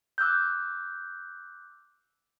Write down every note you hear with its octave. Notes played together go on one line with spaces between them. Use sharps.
D6 E6 F#6 G6